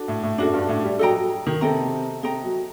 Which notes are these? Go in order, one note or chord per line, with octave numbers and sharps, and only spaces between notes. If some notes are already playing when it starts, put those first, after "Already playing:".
Already playing: D4 F#4 A4
A2
A2
F#2 D4 F#4 A4
G2
A2
G3
F#3 A4 D#5 G5 A#5
F#3
D#3
C3 A4 D#5 G5 A#5
C3 A4 D#5 G5 A#5
F#3